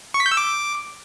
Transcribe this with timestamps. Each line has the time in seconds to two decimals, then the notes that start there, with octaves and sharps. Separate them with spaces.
0.14 C#6
0.20 B6
0.26 G6
0.32 E6
0.37 D6